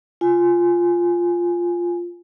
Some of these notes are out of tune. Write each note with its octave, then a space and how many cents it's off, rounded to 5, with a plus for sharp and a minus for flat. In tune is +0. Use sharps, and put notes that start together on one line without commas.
F4 +0 G#5 +0